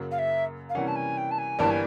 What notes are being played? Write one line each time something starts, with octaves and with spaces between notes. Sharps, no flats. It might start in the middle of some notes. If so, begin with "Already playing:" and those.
Already playing: F#2 C#3 F#3 A#3
F5
E5
F5
C3 E3 G3 A#3 C#4 F#5
A5
G#5
G5
A5
G#5
G1 G2 E3 G3 A#3 A5
G#5